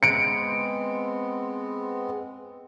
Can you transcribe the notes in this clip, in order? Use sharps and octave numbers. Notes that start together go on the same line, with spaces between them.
G#3 B3 C4 C#7 D7